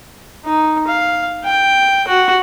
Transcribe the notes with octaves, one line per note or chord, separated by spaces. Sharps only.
D#4
F5
G5
F#4